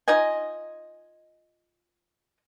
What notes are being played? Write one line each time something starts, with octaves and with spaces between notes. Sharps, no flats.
D#4 F4 D#5 G#5